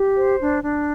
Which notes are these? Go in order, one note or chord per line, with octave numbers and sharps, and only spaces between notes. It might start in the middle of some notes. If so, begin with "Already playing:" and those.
Already playing: G4
C5
D4
D4